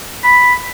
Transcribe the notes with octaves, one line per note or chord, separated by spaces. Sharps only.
B5